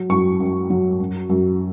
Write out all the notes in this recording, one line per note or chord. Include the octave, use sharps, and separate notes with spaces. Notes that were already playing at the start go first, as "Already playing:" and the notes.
Already playing: F#3
F#2 C#6
F#2
F#3
F#2
F#2